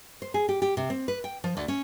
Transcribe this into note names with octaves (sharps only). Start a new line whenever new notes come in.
C5
G#4
G4
G4
C3
C4
B4
G5
F3
D2
C#4